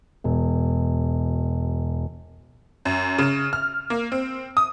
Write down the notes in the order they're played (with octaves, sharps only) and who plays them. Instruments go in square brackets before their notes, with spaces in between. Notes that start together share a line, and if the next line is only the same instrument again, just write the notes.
[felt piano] E1 B2
[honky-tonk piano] F#2
C#3
F6
A#3
C4
D#6